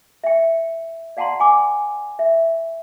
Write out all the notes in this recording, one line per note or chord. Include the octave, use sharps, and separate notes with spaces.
E5 G5
D5 F5 F#5 A5 A#5 C6
G#5 D6
E5